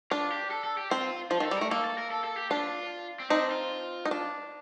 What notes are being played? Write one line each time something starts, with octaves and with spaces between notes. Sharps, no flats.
D4 F4
G4
A4
A4
G4
C4 F4
F3 F4
D#3 A4
G3
A3 A#4
A#3 A4
A4
A#4
A4
A4
G4
D4 F4
C4
C4 D4 D#4
F4
D#4
D4